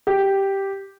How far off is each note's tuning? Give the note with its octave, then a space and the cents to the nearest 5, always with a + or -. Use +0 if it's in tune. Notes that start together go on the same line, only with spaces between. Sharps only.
G4 -5